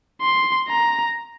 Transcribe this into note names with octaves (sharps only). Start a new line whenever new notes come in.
C6
A#5